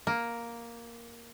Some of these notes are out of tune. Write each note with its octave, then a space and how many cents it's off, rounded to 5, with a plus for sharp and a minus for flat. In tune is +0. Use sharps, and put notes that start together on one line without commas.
A#3 +5